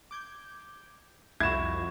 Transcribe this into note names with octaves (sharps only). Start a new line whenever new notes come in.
D6 G6 G#6
C2 F2 E4 F#4 G#6 E7